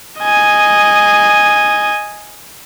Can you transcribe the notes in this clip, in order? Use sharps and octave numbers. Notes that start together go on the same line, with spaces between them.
D#5 G#5